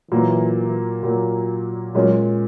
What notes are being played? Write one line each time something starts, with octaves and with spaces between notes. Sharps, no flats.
A#2 E3 F#3 A#3
A#2 F#3 A#3
A#2 F#3 G#3 C#4